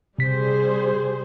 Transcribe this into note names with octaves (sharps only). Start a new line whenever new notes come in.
C3 G3 G#4 C5 B6